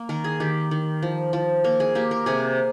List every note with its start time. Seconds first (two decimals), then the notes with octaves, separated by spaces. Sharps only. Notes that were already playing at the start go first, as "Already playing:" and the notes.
Already playing: A#3
0.09 D#3 A#4
0.24 G#4
0.40 D#3 G4
0.71 D#3
1.02 F3
1.33 F3
1.64 A#3 A#4
1.80 G#4
1.95 A#3 G4
2.11 A#4
2.26 C3 G#4